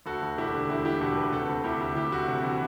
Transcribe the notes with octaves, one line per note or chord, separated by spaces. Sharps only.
D2 F#4 A4
D2
E1 E4 G4
D3
E1 E4 G4
E1 E4 G4
E1 F#4 A4
D2 G4 B4
C3 F#4 A4
D2
D2 E4 G4
D2
D2 E4 G4
D2 F#4
C3 F#4
E3 F#4